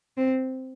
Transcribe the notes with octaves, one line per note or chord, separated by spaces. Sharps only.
C4